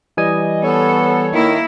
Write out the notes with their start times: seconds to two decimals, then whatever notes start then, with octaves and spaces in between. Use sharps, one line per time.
0.17 E3 G3 D#5 G#5
0.64 B3 A4 C#5
1.33 D#3 A#3 E4